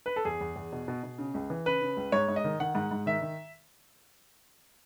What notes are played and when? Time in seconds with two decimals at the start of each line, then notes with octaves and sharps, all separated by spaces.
0.06 B4
0.16 A4
0.25 E2 G#4
0.41 E2
0.56 E2
0.72 B2
0.88 B2
1.03 B2
1.18 C#3
1.34 C#2
1.50 E3
1.66 C#3 B4
1.82 C#3
1.97 C#2
2.12 G#2 C#5
2.28 G#2
2.36 D#5
2.44 D#3
2.60 D#3 F#5
2.75 G#2
2.91 G#2
3.06 D#3 E5
3.21 D#3